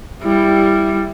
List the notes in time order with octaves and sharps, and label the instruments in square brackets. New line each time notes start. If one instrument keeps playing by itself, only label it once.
[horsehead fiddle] G3 E4